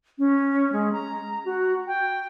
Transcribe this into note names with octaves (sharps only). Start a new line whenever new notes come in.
C#4
G#3
A#5
F#4
G5